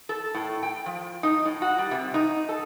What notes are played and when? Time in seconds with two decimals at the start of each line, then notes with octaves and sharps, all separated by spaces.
0.09 A4
0.34 A2
0.63 G5
0.86 F3
1.23 D#4
1.45 A2
1.62 F#4
1.78 G3
1.91 C3
2.14 D#4
2.49 A4